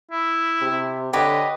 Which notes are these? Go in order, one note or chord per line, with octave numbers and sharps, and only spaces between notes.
E4
C3
D3 G4 B4 C#5 D#5